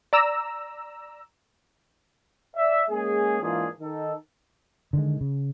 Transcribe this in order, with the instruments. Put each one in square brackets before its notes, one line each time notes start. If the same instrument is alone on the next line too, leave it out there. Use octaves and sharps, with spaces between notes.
[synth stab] D5 A#5 E6
[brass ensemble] D5 E5
G#3 A#3 C#4 G#4
G#2 E3 A#3 D4 F4 G#4
D#3 D#4 A4
[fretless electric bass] D3 D#3 G#3
C#3